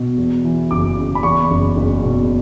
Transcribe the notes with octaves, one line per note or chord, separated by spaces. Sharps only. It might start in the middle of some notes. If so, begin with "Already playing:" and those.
Already playing: B2
E2
E3
F#1 D6
C#3
B5
E2 C#6
F#1
F#1
B2